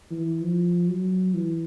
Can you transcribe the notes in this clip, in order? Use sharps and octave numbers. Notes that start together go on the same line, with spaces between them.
E3
F3
F#3
E3